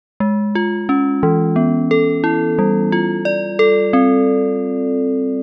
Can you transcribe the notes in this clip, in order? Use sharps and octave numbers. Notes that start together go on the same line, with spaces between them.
G#3
F4
C#4
E3
B3
A4
E4
G3
F4
D5
A4
C4